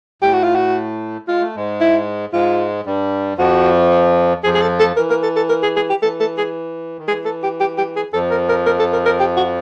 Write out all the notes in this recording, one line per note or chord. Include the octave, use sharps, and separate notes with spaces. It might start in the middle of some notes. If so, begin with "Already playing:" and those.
A2 A3 G4
F#4
F4
F#4
G#3 F4
A3
G#2 G#3
E4
G#2 G#3 F4
G2 G3
F2 F3 F#4
F2 F3 G#4
G#4
A4
A4
E3 A#4
A#4
A4
A4
A#4
G#4
G#4
G4
E3 A4
A4
G#4
D#3
E3 G#4
A4
G4
G4
G4
G#4
F2 F3 A4
A#4
A#4
A#4
A4
A#4
A#4
G4
F#4